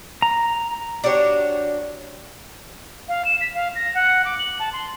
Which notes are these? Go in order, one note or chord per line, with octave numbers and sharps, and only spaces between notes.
A#5
D4 F#4 G4 C#5
F5
E7
B6
F5
A#6
F#5
D6
F#7
A5
C6